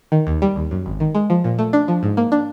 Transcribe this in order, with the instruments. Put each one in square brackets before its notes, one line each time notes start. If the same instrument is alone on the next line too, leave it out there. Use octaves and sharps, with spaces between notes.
[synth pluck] D#3
D#2
G3
D#2
F#2
G#1
D#3
G#3
F3
A#2
A3
D4
F3
G#2
A#3
D4